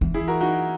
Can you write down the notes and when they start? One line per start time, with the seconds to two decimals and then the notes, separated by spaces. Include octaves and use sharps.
0.01 E3
0.14 E4 G#4
0.27 F#4 A#4
0.40 D#4 F#4